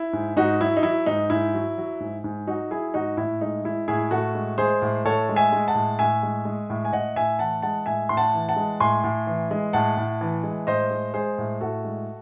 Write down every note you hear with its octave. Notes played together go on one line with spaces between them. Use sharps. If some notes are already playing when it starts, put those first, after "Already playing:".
Already playing: E4
G#2
G#2 D#4 F#4
F#3 E4
D#4
F#3 E4
G#2 D#4
G#2 E4
F#3
F#3
G#2
G#2
F#3 D#4 F#4
F#3 E4 G#4
G#2 D#4 F#4
A2 E4
G#3 D#4
G#3 E4
A2 E4 G#4
A2 F#4 A4
G#3
G#3 G#4 C5
A2
A2 A4 C#5
G#3
E5 G#5
G#3
F#5 A5
A2
A2 E5 G#5
G#3
G#3
A2
G#5
A2 D#5 F#5
A2 E5 G#5
E3 F#5 A5
G#3 F#5 A5
A2 E5 G#5
A2 C6
F#5 A5
E3
F#5 A5
G#3
A2 G#5 C6
A2
E3
G#3
A2 F#5 A5
A2
E3
G#3
A2 C5 D#5
G#3
G#3 G#4 C5
A2
A2 F#4 A4
G#3